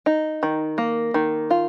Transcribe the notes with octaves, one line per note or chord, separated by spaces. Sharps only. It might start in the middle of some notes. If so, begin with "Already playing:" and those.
D#4
D#3
A#3
D#3
F4